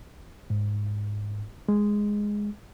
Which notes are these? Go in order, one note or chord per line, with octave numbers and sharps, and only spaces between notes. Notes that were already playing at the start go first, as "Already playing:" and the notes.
G#2
G#3